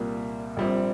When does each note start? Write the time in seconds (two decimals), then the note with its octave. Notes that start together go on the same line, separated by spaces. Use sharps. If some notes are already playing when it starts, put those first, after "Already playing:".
Already playing: C2 A#2 G3 A#3
0.57 A#1 A#2 G3 C4